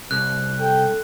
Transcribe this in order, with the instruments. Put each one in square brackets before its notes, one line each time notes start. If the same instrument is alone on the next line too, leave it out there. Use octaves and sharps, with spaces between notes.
[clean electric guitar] C2 [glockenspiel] F#6
[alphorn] A4 [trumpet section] G5